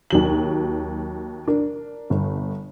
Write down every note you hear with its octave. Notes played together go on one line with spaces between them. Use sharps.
D#2 F#3 F#7
D4 A#4
G1